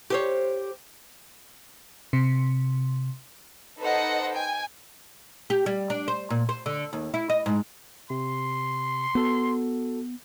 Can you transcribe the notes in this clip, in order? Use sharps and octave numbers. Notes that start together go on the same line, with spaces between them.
G4 C5 C#5
C3
D#4 A4 B4 C5 D#5 F#5
G5 G#5
G4
G3
D4
C5
A#2
C5
D3
D#2
E4
D#5
G#2
C3 C6
B3 F#4 A4